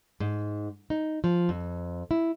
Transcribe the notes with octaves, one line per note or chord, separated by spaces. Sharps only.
G#2
D#4
F3
F2
E4